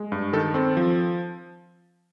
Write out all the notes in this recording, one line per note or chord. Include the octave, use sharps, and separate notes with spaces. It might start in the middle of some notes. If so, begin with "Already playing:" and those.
Already playing: G#3
G2
D#3 A4
C4 A4
F3